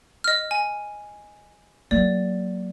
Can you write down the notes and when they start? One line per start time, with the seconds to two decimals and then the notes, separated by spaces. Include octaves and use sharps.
0.24 D#5 F6
0.51 G#5
1.91 F#3 A#3 D5